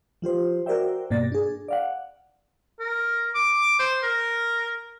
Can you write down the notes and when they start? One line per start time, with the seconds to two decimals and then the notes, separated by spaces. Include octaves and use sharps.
0.22 F3 F4 G4 C5
0.66 F#4 A#4 C5 D5 E5 G5
1.10 G2 B2 A#3 D5 A6 A#6
1.32 D4 G#4
1.68 D5 F5 F#5
2.80 A#4
3.35 D6
3.79 C5
4.03 A#4